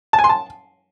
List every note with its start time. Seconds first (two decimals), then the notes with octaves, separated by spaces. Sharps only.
0.13 A5
0.19 G#5
0.24 C6
0.29 A5